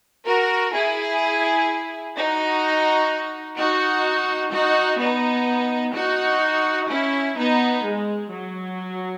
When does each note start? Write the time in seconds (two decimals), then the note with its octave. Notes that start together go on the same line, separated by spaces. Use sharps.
0.26 F#4 A#4
0.74 E4 G#4
2.16 D#4 F#4
3.58 D#4 F#4
4.52 D#4 F#4
5.00 B3 D#4
5.95 D#4 F#4
6.90 C#4 E4
7.37 B3 D#4
7.84 G#3
8.32 F#3